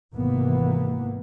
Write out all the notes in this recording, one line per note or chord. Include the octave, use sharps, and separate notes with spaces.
G#1 C3 E3 A#3 B3